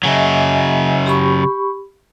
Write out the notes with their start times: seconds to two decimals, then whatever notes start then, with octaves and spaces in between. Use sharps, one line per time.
0.03 C#3 F#3 D#5 E5 G#5
1.06 G4 B5 C#6